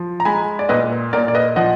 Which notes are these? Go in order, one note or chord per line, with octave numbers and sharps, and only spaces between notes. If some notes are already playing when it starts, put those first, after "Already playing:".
Already playing: F3
A#5
G#3 G#5 B5
D5
A#2 B4 D#5
A#2 A#4 D5
D5
B4 D#5
F3 D#5 F#5